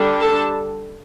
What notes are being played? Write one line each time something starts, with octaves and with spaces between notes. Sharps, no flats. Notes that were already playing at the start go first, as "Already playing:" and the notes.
Already playing: D3 G3 D4
A4 A5